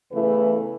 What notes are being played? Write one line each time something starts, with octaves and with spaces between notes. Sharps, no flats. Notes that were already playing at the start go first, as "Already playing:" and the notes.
E2 C#3 E3 A3 B4